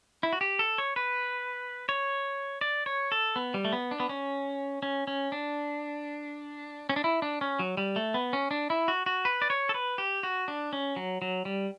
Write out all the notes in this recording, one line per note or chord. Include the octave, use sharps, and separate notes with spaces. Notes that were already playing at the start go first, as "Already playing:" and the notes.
E4
F#4
G4
A4
C#5
B4
C#5
D5
C#5
A4
B3
G3
A3
B3
D4
B3
C#4
C#4
C#4
D4
C#4
D4
E4
D4
C#4
F#3
G3
A3
B3
C#4
D4
E4
F#4
F#4
B4
D5
C#5
A4
B4
G4
F#4
D4
C#4
F#3
F#3
G3